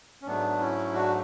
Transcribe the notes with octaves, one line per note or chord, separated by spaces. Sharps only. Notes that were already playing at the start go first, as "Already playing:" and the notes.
C#4
G#2 F#3 A3 B3 D4
C#4 E4
D4 F#4